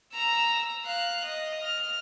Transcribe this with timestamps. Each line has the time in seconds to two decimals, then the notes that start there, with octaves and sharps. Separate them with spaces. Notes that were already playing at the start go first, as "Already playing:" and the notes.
0.13 A#5 E6
0.85 F5 F#6
1.24 D#5
1.63 F6